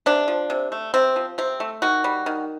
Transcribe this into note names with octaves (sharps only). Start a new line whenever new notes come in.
C3 D4
F3
C3
A3
C3 C4
F3
C3 C4
A3
D#3 F#4
G3
D#3